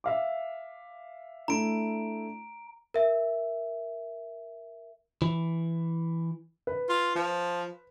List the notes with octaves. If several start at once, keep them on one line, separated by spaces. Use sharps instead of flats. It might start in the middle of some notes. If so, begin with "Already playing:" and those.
E5 F5 D6
A3 D4 E4 A#5 D7
A#4 E5
E3
B4
F4
F3